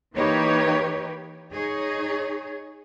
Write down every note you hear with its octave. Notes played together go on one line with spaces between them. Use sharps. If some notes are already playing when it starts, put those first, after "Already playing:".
E3 A#3 D#4 G4 B4 C#5
D#4 G#4 C#5